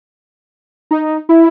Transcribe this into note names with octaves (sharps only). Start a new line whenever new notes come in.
D#4
E4